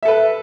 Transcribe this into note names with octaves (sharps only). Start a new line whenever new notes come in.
A4 B4 E5